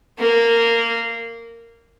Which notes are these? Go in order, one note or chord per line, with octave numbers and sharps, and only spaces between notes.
A#3